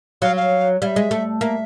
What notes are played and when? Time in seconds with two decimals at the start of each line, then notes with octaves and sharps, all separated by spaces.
0.22 F#3 F5
0.37 F5
0.82 G3 F5
0.86 E5
0.96 G#3
1.11 A3
1.41 A#3 E5